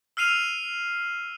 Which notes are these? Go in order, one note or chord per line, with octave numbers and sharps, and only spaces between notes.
E6 F6 C7 D#7 F7